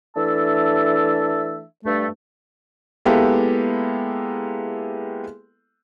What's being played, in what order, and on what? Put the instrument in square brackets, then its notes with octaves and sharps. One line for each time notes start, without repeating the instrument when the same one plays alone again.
[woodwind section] E3 A3 D4 E5 A5 E6
G2 A3
[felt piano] G#3 A#3 B3 E4 G4 A4